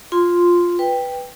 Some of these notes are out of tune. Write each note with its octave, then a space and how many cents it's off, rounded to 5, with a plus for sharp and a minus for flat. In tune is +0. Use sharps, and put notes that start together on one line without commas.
F4 +5 C6 -5
B4 +0 G5 +10